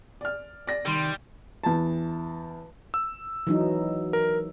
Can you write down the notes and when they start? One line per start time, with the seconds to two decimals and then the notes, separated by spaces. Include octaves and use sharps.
0.21 D5 F6
0.67 D5 A#6
0.86 C2 D#3 G3 C6
1.63 E2 A5
2.94 E6
3.47 E3 F#3 D#4
4.13 A#4